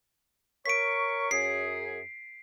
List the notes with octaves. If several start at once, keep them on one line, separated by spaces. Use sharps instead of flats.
A#4 C#5 C#6 B6 D7
F#2 G#4 C7